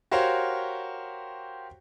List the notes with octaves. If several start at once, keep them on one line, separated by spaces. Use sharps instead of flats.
F#4 G4 A#4 C5 C#5 F5